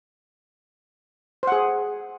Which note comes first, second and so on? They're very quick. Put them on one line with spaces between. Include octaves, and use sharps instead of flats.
C5 F#5 G#4